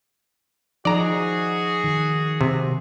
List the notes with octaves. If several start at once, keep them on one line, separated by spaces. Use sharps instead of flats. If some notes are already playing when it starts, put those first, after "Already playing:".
F3 D#4 F#4 G#4 D5 A#5
D#3
C3